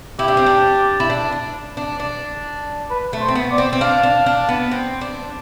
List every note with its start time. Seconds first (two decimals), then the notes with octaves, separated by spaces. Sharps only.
0.19 E4 G4
0.28 D4
0.37 C4
0.46 D4
1.00 E4
1.10 D4
1.32 D4
1.77 D4
2.00 D4
2.90 B4
3.13 A3
3.21 C5
3.28 C4
3.35 B3
3.51 D5
3.58 C4
3.73 C4
3.81 D4 F5
4.03 D4
4.26 D4
4.49 B3
4.71 C4
5.01 D4